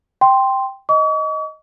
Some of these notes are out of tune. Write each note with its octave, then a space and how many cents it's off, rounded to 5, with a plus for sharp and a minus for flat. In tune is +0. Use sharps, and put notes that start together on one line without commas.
G5 +0 C6 +0
D#5 +5 C#6 +45